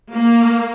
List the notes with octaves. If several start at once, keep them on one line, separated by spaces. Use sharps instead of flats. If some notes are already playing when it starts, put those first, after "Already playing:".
A#3